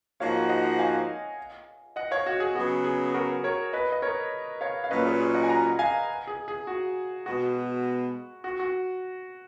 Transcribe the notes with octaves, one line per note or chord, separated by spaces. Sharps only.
G#2 F3 A#3 D#4 F#4 C#5 F5
D#5 F#5
F5 G#5
D#5 F#5
C#5 F5
F#4
G#4
C#3 F#3 B3 F#4
G#4
F#4 A#4
A#4 C#5
B4 D#5
D#5
A#4 C#5
C#5 F5
F5
A#2 F#3 C#4 B4 D#5
G#4 B4
G#4
D#5 F#5
G#5
F#5 A#5
F5 G#5
G#4
G#4
F#4
B2 G#3 B3 F#4
F#4
F#4